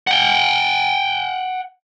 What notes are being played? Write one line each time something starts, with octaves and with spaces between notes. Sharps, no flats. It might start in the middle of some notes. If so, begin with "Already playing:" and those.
F#5 G5